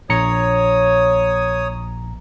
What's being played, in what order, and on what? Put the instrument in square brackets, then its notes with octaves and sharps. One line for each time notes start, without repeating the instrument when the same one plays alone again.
[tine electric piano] A#1 A#5 C#7 [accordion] C#5 D#6